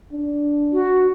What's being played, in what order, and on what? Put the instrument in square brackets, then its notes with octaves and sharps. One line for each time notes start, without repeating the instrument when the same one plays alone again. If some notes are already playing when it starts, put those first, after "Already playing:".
[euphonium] D4
[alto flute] F#4